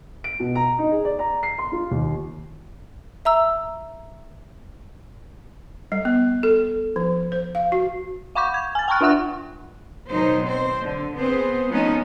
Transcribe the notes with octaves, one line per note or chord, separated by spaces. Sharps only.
D7
B2
A#5
D#4
G#4
D5
A#5
C7
C6
F4
D#2
E5 A#5 E6
G3
B3
A4
F3
C5
F5
F#4
F5 F#5 B5 C#6 D6 G6
G#6
G#5 A6
G5 A5 B5 C#6 F6 F#6
D4 F4 E5 F#5 C#6 F#6
B2 D#3 F#3 D#4 C5
C4 C5
D3
B3 C4 G#4 C5
F3 G#3 A3 B3 C#4 D#4